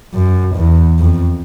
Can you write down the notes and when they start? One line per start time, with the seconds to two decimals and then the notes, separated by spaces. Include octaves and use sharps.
0.14 F#2
0.56 E2
0.99 F2